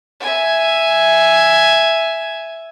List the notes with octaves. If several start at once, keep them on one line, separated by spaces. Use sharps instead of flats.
E5 G#5